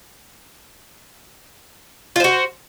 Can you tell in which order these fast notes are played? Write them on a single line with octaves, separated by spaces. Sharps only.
F4 C5 F#4